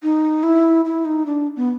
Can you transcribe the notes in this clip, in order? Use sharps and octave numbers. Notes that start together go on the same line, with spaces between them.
D#4
E4
E4
D#4
D4
B3